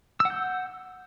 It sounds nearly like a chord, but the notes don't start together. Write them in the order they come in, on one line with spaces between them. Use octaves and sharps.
E6 F#5 G6